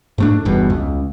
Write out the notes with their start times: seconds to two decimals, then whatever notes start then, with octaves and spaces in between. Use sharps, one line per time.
0.18 G#2 A3 D4
0.45 G1 E2 G2 B2
0.70 C#2